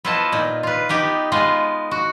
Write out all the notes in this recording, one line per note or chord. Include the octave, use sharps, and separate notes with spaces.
B3 E4 F4 C5 D#5 A5
A#2 D#4
F4 B4
B3 D#4 G4
G#3 B3 F4 D#5
F#4